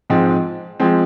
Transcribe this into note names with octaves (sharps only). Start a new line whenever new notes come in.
G#2 F3 G#3 C4
F3 G#3 C4